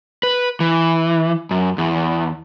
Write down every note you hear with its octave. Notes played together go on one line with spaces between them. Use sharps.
B4
E3
F#2
E2